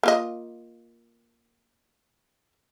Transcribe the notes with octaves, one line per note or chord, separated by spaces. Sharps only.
A#3 F4 D#5